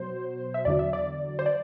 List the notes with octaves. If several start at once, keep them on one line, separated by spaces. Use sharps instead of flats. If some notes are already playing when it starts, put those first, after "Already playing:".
Already playing: B2 F#3 C5
E5
E2 D3 F#3 D5
E5
D5
C5
D5